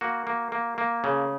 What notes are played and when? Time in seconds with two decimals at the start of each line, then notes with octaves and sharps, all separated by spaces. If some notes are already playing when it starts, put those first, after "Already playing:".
0.01 A#3 F#4
0.27 A#3
0.52 A#3
0.78 A#3
1.04 C#3